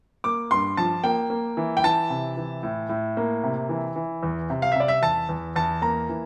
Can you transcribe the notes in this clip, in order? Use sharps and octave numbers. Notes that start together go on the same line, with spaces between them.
A#3 D6
G2 C6
F3 A5
A#3 G5
A#3
E3
G5
E3 A5
C3
E3
A2
A2
A#3
C3
E3
E3
E2
C3
F5
E5
C3 D5
E5
E2 A5
E2
E2 A5
A#3 A#5
E3